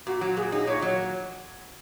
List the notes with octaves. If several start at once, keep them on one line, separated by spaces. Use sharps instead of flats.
A#2 F#4
F#3 F#4
A#2 G#4
D#4 G#4
A#2 C#5
F#3